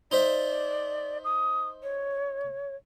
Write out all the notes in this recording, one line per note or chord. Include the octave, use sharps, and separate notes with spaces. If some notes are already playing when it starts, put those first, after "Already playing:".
D#4 C5 D5 E5
D#6
C#5